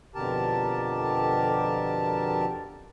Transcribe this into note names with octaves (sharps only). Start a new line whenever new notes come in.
F2 B2 D3 G4 A#4 A5